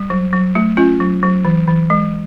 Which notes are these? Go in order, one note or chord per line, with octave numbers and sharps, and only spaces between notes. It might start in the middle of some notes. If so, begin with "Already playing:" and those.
Already playing: G3
F#3
F#3
A3
C#4 F4
F#3
F#3
E3
E3
G#3